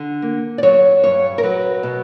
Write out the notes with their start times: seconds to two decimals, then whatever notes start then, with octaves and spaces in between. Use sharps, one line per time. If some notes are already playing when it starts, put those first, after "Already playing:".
Already playing: D3
0.22 A#3
0.58 D5
0.63 F#3 C#5
1.04 G2 C#5
1.38 A#4
1.43 F#3 B4
1.83 B2